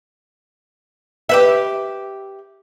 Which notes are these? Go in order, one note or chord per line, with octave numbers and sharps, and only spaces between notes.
G4 B4 E5